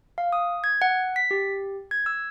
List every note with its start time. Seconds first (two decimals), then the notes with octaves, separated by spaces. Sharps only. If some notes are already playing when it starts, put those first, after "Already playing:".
0.18 F5
0.33 D#6
0.64 G#6
0.82 F#5
1.16 B6
1.31 G4
1.91 G#6
2.06 E6